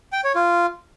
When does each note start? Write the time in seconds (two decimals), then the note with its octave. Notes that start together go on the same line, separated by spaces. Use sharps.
0.13 G5
0.24 C#5
0.36 F4